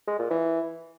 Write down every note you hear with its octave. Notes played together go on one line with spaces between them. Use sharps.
G#3
A#2
E3